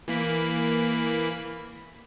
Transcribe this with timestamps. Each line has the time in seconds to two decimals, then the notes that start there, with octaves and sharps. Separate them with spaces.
0.08 E3 A#3 B5